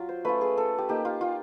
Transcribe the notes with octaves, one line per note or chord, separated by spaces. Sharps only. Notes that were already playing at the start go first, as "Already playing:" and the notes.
Already playing: F#3 F4
C5
A3 C#4 F4 B4
G#4
A4
G4
A#3 D#4 G4
F4
F4